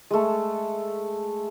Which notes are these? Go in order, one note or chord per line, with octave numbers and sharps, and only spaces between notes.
G#3 A3